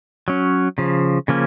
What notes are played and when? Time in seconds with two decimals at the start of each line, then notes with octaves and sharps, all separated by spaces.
0.28 F#3 C#4
0.78 C#3 F3
1.28 C#3 F3 A#3 C#4